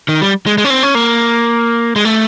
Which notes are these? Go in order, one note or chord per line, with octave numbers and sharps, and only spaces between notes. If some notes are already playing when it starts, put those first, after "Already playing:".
D#3
G3
G#3
G#3
C#4
C4
C#4
A#3
G#3
A3